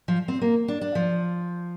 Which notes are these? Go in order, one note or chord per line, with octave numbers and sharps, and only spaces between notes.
F3
C4
A#3
D4
D4
F3